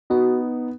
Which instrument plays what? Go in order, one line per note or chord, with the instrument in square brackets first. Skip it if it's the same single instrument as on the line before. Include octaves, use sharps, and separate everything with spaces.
[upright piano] B3 D#4 [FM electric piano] F#4